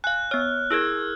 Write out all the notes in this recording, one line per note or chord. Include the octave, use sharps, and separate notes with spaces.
F5 G#5 F#6
B3 C#5 F6
E4 G#4 A#4 E6 G#6